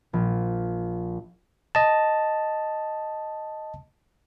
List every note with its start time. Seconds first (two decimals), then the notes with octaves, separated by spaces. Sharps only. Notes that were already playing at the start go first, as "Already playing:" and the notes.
0.13 A#1
1.75 D#5 A5